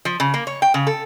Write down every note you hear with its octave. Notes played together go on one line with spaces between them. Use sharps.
F3
C#3
A#3
C#5
G5
C#3
A4